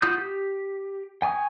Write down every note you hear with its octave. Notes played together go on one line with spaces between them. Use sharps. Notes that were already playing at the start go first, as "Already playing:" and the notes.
F4 F#4 D#6 G6
G4
G5 G#5 C#6 D#6